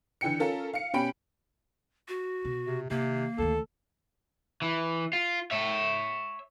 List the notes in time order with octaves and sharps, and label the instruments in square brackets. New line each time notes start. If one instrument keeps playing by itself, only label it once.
[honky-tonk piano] D3 E3 G5 C#7
C#4 F4 A4 A#4
F5 C#7
B2 C#4 G4 G5 B5 D7
[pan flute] F#4
[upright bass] B2
[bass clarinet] C3
[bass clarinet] C3 [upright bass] D#3 [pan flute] A#3
[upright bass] D2 D#3 [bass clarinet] A4
[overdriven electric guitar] E3
F4
C#5 E5